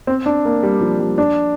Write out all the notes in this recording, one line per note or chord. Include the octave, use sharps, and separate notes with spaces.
C4
D4
A#3
G3
F3
G3
D4